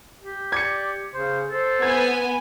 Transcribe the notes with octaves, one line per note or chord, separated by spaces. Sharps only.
G4
D5 G#6 C#7
C#3 C5
A4 C5
B3 G#5 G#6